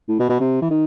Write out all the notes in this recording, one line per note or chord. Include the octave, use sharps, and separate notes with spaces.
A2
B2
B2
C3
E3
D#3